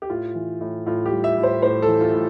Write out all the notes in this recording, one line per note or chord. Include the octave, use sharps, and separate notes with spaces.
G4
A2 F4
E3
A2
A2 F4
G4
G3
E5
A2
C5
A2 C5
A4
E3
F4
A2